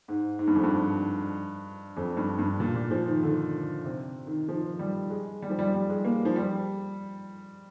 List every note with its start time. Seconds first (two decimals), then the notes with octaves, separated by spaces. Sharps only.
0.08 G#2
0.39 G#2
0.47 G2
0.56 F2
0.63 G2
1.97 F2
2.17 G2
2.38 G2
2.60 A#2
2.75 A#2
2.91 F3
3.07 D#3
3.23 D3
3.84 C3
4.27 D#3
4.48 F3
4.79 G3
5.10 G#3
5.42 G3
5.50 F3
5.59 G3
5.74 G3
5.90 G#3
6.05 A#3
6.25 F3
6.36 G3